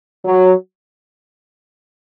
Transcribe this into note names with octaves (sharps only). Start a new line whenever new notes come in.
F#3